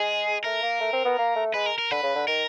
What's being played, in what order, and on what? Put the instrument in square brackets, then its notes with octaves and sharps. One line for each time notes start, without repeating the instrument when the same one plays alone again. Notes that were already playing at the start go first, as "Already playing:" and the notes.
Already playing: [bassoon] G#3 [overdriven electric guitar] G#4
[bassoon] A3 [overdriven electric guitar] A#4
[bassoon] A#3
A3
C4
B3
A#3
A3
[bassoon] G#3 [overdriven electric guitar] B4
[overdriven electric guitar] A#4
A#4
[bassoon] D3 [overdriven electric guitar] B4
[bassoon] C#3
D3
[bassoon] D#3 [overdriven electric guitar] A#4